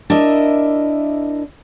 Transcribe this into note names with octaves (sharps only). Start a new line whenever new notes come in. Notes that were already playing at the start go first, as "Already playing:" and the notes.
D4 E4 A#4 D#5 E5